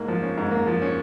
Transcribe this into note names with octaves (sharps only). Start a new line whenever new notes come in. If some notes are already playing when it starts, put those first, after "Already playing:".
Already playing: G#2 A#3
F3
C#4
G#2
A#3
F3
C#4